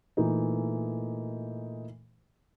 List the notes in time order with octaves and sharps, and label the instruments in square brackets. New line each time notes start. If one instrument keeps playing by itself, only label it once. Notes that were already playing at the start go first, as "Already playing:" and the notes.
[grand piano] A#2 E3 A3 D#4